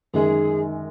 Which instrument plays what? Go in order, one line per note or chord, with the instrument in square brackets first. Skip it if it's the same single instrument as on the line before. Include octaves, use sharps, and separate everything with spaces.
[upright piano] F#2 D#3 G#3 [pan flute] G#4